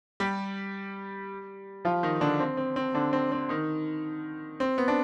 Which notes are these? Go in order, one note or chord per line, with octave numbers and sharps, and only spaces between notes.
G3 G4
F3 F4
D#3 D#4
D3 D4
C4
C4
C4
D3 D4
C4
C4
D#3 D#4
C4
B3
D4